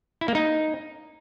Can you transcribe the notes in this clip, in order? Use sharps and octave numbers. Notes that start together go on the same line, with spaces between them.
E4
A#3
D#4